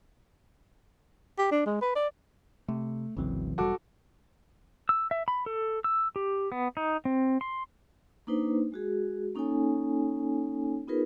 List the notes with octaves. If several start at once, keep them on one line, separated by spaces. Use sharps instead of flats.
G4
D4
G#3
B4
D5
C3 A3
G#1 D2 C#3 E3 F#3 C4
E1 G3 F#4 A4 D6
E6
E5
B5
A4
E6
G4
B3
D#4
C4
C6
A#3 D4 D#4 B4 C5
G#3 F#4 G#4
A#3 C#4 D#4 A4 C#5 G#5
B3 D#4 F4 G#4 A#4 B4